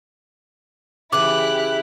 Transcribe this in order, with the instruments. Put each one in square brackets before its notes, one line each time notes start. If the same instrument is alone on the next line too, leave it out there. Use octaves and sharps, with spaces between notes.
[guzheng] C#3 E3 [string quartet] E4 G4 [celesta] D6 [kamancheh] F#6